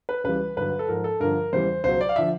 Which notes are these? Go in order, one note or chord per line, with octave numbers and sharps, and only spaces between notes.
B4
C#2 C#3 E3 G3 B4
G2 D3 F#3 B4
A4
G#2 F3 A#4
A4
G2 D3 F3 A#4
E2 C#3 E3 G3 C5
C#2 B2 F#3 C5
D5
F5
D3 F3 E5